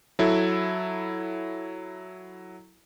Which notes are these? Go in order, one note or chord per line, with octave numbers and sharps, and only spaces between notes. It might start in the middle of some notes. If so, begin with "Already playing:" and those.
F#3 E4 A4